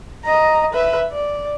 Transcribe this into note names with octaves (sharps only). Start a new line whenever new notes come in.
D#5 A#5
B4 E5
D5